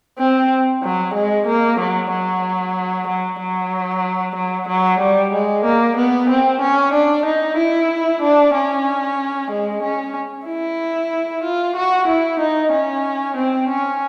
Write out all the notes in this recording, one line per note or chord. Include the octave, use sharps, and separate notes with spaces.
C4
F#3
G#3
A#3
F#3
F#3
F#3
F#3
F#3
F#3
G3
G#3
A#3
B3
C4
C#4
D4
D#4
E4
D4
C#4
G#3
C#4
E4
F4
F#4
E4
D#4
C#4
C4
C#4